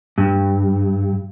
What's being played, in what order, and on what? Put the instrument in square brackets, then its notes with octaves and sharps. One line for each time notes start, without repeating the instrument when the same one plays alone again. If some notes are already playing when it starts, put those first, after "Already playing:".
[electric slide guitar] G2